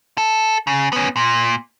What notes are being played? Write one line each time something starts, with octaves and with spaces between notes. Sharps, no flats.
A4
C#3
B3 C#4
A#2